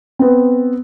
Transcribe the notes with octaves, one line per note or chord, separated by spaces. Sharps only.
B3 C4